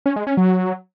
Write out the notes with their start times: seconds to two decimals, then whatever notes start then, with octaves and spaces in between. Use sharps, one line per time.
0.06 C#4
0.16 G#3
0.27 C#4
0.37 F#3